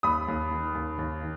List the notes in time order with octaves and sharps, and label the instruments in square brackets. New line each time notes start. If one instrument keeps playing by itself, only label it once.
[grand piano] D#2 B5 D#6
D#2
D#3
D#2
D#2
D#3